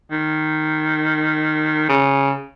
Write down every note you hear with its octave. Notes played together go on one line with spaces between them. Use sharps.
D#3
C#3